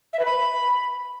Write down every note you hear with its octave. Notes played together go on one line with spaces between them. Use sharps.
E5
B4
B5